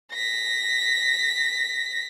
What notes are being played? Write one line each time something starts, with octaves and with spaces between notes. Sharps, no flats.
A#6 B6